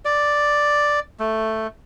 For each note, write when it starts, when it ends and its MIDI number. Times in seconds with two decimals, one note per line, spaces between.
0.05 1.00 74
1.20 1.67 57